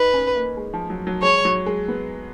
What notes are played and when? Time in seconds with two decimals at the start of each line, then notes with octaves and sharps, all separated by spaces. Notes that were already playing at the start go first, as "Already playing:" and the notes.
Already playing: D#4 B4
0.14 C#4
0.35 A#3
0.57 G#3
0.73 F3
0.90 F#3
1.07 F#3
1.22 G#3 C#5
1.45 F#3
1.66 G#3
1.88 B3